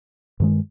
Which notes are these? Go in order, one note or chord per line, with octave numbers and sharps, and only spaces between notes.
G2 D#3 G#3